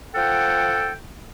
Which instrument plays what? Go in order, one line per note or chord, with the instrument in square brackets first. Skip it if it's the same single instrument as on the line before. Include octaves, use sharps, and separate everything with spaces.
[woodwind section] F3 A4 F#5 G5